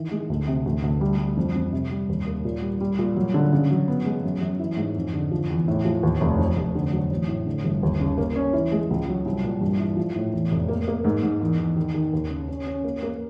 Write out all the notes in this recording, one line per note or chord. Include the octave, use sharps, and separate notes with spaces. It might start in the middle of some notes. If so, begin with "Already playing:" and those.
Already playing: D#3 E3
G#3
D2
C3
D2
D2
G3
G3
F2
F2
C3
G3
D#2
A#3
A#2
G3
G3
A#2
F#3
D3
C#3
F#3
B3
G#3
F#2
F#2
E3
G#2
F2
D3
F3
E2
A2
F3
D#2
F1
F2
F1
D3
F#3
A1
A2
D3
G1
D#2
C#3
A#3
C#4
E3
G#3
C#2
F#3
C2
A#2
G2
E3
F3
A2
E2
F1
A#3
A#3
G#2
G#2
E2
E2
D#3
D#3
D#2
C#3
C#4
C#4
A#3
A#3